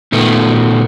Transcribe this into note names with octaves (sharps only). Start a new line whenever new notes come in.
A#2 D#3 A3 B3